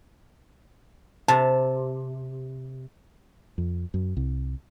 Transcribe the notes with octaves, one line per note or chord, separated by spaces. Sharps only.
C3 A5
F2
F#2
C2